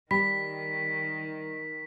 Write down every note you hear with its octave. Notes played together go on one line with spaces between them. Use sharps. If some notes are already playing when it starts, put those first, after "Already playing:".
D#3 G3 G4 B5 B6